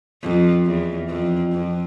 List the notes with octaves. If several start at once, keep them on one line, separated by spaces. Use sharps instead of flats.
F2
E2
F2
F2